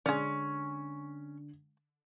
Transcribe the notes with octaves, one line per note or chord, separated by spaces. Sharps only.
D3 G#3 C#4 D5